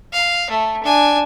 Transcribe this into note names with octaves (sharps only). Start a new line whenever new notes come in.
F5
A3
D4 G#5